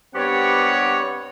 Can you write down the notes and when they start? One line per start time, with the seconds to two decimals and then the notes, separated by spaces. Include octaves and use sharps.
0.14 G2 B3 C4 G4 C#5 F#5